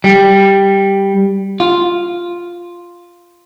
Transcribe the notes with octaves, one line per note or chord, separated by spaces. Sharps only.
G3
F4